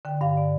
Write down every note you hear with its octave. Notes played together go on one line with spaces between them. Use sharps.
D3 G5
G2 F5
D5